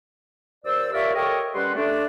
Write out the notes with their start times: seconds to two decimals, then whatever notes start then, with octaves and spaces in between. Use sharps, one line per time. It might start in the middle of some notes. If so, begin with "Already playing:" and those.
0.65 D#2 C5 D5 E6
0.92 F4 G4 A#4 C#5 D5 E5
1.14 G4 A4 A#4 C#5 D#5 G5
1.54 G3 C#4 B4 F#5 C6
1.75 A3 D4